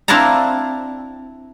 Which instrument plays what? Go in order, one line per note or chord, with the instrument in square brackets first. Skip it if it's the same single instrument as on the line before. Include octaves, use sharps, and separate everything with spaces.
[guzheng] C4 D4 E4 F5 A5 A#5